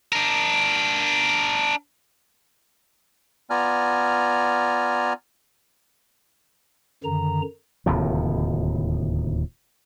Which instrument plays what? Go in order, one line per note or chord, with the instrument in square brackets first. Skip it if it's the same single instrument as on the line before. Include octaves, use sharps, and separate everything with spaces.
[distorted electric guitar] D4 A#4
[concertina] B3 F4 D5 G#5 A#5 F6
[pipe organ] F#2 D3 D#3 A#5
[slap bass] D1 D#2 C3 F3